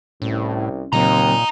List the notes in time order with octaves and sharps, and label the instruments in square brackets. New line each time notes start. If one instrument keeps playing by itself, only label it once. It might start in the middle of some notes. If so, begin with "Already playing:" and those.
[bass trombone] C2 [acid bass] A2 [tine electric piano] C#4
[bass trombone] D#2 [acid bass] A#2 [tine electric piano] C#3 F#3 C4 [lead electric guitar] D#5 A#5